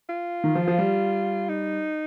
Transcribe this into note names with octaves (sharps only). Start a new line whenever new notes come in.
F4
D#3
F3
F3
G3
D#4